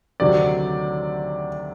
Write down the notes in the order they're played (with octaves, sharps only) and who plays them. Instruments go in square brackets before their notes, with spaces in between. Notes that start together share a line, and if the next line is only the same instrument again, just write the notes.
[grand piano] D2 C3 D#3 F#3 D5